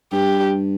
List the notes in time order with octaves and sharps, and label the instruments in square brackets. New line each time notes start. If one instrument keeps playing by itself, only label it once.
[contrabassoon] G2 [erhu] G4